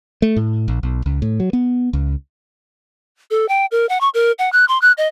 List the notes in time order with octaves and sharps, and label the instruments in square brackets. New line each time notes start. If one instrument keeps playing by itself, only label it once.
[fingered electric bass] A3
A2
A#1
B1
C#2
A2
F#3
B3
C#2
[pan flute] A4
G5
A#4
F#5
C#6
A#4
F#5
F#6
C6
F#6
D#5